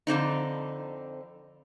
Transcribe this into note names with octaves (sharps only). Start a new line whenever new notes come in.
F2 D3 C4 D#4